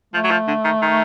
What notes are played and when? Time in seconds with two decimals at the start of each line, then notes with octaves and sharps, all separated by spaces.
0.14 F3 A3
0.24 F#3
0.31 F3
0.48 D3
0.65 D#3
0.82 D#3